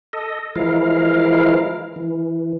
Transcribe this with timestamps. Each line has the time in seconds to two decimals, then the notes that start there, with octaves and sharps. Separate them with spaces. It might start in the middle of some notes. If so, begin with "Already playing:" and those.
0.13 A4 D#5
0.56 E3 F3 G#3 E4 A#4 F5
1.96 E3